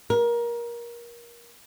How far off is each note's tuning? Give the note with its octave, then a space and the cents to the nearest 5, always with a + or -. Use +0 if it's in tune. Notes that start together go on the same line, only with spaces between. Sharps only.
A#4 +25